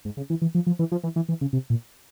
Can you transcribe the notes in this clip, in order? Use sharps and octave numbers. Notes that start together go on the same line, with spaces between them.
G#2
C#3
E3
E3
F3
F3
E3
F3
E3
E3
E3
C#3
C3
A#2